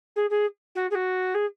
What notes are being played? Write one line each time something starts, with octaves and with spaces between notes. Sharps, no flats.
G#4
G#4
F#4
G#4
F#4
G#4